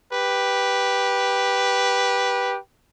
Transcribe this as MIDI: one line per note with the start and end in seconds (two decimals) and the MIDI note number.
0.12 2.59 67
0.12 2.59 71